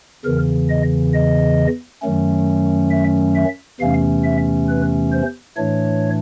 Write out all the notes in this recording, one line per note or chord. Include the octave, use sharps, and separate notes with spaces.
E2 C#3 E3 A#4
D#5
D#5
F#2 D#3 F#3 A3 C#4
E5
E5
E2 C3 E3 A3 C#4 F5
E5
B4
C5
A2 E3 A3 D4 C#5